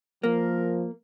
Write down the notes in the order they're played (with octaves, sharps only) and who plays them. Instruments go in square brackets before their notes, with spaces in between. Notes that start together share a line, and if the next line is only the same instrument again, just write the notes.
[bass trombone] F3 [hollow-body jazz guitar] A#3 [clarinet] A#4